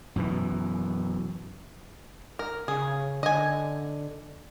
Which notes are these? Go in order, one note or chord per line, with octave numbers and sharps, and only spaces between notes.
F#2 B2 E3
A#4
C#3 G#4
D3 D#5 G#5